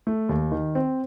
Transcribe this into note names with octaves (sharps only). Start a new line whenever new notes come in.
A3
D#2
D#3
C4